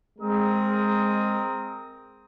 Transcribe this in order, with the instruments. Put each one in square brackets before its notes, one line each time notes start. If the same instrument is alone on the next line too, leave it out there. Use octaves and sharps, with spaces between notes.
[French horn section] G#3 [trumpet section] C4 A#4 D#6